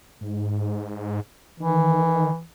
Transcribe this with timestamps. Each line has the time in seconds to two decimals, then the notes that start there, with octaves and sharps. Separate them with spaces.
0.21 G#2
1.60 D#3 E3